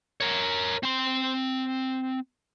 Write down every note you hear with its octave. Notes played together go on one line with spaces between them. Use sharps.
A#4 C#5
C4 C6